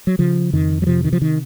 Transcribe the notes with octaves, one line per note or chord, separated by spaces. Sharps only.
F#3
C#3 F3
F2 D#3
F#3
C3 F3
D#3
F3
D#3